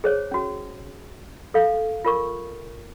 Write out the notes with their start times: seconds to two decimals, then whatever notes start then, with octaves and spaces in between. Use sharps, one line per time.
0.04 G#4 C5 C#5
0.31 C#4 F#4
1.54 A4 F5
2.05 F4 A#4 C#6